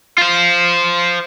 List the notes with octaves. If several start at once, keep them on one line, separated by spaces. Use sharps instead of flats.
F4 C5